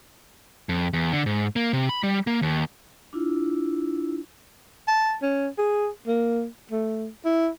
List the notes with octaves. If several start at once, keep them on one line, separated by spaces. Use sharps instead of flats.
F2
E2
D3
G#2
A#3
C3
B5
G3
A#3
D#2
D4 E4 F4 E6
A5
C#4
G#4
A#3
A3
E4